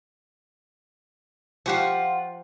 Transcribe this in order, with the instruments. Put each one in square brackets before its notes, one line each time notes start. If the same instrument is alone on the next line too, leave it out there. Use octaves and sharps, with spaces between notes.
[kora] F3 G4 F5 [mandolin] F4 F#5 C#6